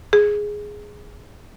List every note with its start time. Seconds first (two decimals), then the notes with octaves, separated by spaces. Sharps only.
0.13 G#4